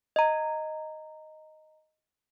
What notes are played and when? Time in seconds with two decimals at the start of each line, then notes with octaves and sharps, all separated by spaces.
0.16 D#5 A#5